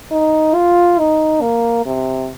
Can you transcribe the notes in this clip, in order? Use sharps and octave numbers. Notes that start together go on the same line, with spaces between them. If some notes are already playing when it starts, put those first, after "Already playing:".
D#4
F4
D#4
A#3
C3